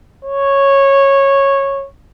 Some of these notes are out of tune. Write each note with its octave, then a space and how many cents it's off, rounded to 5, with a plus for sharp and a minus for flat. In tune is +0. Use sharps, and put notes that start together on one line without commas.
C#5 -10